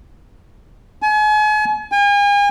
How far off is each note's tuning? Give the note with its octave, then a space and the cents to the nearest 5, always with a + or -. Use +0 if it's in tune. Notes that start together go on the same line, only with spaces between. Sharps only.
G#5 +40
G#5 -40